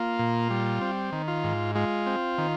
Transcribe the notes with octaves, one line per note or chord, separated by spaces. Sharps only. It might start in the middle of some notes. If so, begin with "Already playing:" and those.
Already playing: A#3 F4
A#2
G3
C4
D#3
F4
G#2
G#3 F4
C4
D#3